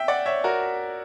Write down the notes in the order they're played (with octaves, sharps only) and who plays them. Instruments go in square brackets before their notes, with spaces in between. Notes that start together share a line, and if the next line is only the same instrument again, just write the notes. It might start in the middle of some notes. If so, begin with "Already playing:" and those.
Already playing: [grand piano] E5 G5
D5 F#5
C#5 E5
F#4 A#4